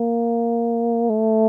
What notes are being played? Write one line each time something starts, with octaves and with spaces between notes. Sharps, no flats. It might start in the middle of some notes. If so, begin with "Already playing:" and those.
Already playing: A#3
A3